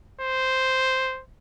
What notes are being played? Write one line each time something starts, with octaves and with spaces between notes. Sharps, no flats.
C5